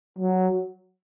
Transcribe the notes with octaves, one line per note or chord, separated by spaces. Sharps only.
F#3